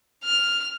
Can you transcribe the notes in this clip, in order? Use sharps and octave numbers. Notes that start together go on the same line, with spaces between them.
F6